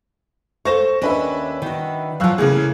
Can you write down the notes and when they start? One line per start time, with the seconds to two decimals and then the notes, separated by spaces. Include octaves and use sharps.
0.65 A4 C5 F5 C#6 A#6 E7
1.02 D#2 C#4 D4 B4 D#5 E5
1.62 D#3 F#4
2.20 F3 F#3 F5 E6 F#6
2.38 A2 C#3 A#3 E4 G#4